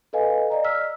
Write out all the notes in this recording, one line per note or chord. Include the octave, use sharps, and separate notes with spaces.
A4 B4 D#5 F5 G#5
D5 D#5 A#5
E6 F6 B6